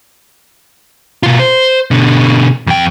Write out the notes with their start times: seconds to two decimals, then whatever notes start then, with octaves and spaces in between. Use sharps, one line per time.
1.23 B2 F4
1.39 C5
1.91 B2 D3
2.67 F2 G5